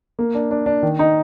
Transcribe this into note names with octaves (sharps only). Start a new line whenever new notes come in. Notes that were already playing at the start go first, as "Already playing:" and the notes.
A#3
D4
D4
D4
D#3
D#4